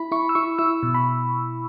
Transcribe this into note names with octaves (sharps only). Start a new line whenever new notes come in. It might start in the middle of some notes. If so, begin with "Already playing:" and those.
Already playing: E4 B5
E4 C#6
E6
E4 C#6
E4 E6
B2
B5